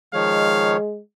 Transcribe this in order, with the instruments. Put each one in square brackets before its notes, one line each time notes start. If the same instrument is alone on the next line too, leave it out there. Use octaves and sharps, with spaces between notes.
[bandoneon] D#3 F3 C#5 [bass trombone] G#3 [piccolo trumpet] F5